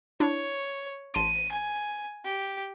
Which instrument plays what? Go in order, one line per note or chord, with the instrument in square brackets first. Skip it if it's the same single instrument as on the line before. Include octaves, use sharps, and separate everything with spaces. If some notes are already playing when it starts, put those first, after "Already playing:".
[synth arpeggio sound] D4 E4 [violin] C#5
[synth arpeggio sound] A1 A5 C6 [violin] D#7
[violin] G#5
G4